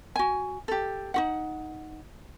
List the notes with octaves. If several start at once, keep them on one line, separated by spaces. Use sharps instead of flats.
F#4 G#5
G4 A4
D#4 F#4 F#5